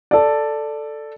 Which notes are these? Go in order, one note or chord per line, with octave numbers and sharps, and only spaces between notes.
A4 D5